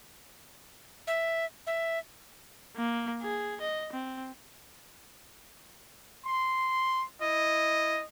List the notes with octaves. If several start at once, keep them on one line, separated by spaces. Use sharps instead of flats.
E5
E5
A#3
G#4
D#5
C4
C6
E4 D#5